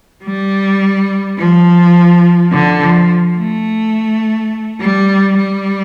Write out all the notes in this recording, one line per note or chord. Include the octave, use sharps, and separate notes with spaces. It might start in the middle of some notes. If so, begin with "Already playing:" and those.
G3
F3
D3
F3
A3
G3
G3